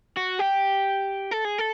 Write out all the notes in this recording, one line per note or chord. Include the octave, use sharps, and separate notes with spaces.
F#4
G4
A4
G#4
A4